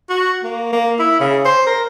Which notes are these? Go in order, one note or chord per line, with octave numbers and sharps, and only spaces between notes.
F#4
A#3
A#3
E4
C#3
C5
A#4